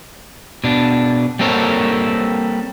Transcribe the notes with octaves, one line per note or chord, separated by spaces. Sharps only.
B2 D4
G3 A#3 C4 A4 A#4 C#5